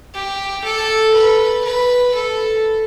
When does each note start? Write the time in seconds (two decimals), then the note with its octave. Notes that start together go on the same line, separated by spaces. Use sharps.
0.14 G4
0.64 A4
1.14 B4
1.64 B4
2.14 A4